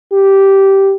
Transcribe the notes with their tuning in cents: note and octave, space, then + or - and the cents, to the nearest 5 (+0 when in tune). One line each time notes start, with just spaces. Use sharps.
G4 -10